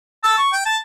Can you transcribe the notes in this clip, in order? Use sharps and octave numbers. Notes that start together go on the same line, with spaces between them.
A5 E6
C#6
G5
A5